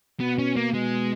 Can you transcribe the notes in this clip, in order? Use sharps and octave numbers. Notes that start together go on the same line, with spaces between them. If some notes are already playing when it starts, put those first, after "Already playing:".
B2 B3
C#4
A#3
B2 G#3